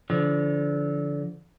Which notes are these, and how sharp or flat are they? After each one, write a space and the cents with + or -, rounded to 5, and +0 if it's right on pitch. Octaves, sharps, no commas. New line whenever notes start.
D3 -25 F3 -35